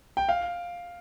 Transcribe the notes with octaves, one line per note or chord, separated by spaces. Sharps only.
G5
F5